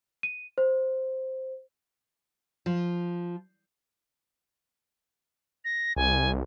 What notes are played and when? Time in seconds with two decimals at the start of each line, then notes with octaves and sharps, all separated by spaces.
0.23 D#7
0.58 C5
2.66 F3
5.65 A#6
5.96 C2 G#5